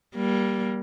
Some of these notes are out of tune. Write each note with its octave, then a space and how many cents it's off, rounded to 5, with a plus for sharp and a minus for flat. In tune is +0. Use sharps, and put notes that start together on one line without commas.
G3 +0 A#3 +25